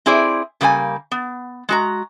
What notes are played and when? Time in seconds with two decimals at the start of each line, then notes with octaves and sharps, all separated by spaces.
0.06 C4 E4 G#4 C5 D5
0.61 C#3 G3 A#3 C5 G#5
1.12 B3
1.69 G#3 F#4 A#5